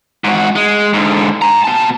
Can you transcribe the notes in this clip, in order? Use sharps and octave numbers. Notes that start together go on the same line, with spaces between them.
G#2 F#4
G#3
G#2 D3
G#5 A#5
B2 A5